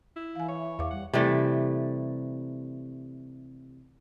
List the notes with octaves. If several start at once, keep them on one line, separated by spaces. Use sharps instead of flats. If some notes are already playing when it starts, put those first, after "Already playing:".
E4
E3 F5 G#5
C#5 E5
E2 E5 F5 D6
G3 F#5
C3 E3 G3 A3